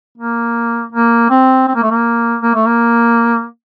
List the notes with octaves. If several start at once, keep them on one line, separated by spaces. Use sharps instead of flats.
A#3
A#3
C4
C4
A#3
A3
A#3
A#3
A3
A#3